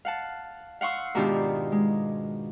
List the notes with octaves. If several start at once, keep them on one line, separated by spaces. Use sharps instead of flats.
F5 F#5 A5
F5 F#5 C6 C#6 E6
G#2 B2 D#3 D4 F4 G4
G#3